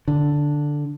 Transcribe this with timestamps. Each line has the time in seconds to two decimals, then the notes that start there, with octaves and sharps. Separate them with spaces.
0.08 D3